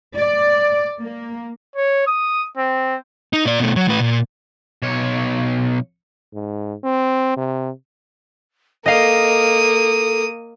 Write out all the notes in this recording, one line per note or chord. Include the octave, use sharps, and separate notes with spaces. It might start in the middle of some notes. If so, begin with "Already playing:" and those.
D5
A#3
C#5
D#6
C4
D#4
A#2 D5
B2 A3
F#3
A2 B4
A#2
B1 C#5
G#2
C4
C3
A#3 A4 D#5 F5 D#6